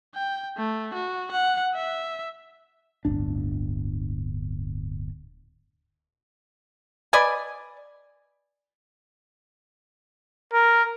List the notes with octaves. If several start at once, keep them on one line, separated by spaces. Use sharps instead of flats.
G5
A3
F#4
F#5
E5
D1 G1 D4
B4 D5 D#5 G#5
A#4